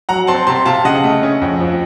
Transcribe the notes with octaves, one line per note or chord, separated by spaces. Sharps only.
F#3 F#5 A#5
C4 A5 C6
C3 A5 C6
C3 F5 A5
C#3 D#5 F#5
A3
C#4
F2
F3